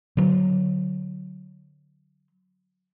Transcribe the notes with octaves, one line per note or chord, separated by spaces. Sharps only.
D3 F#3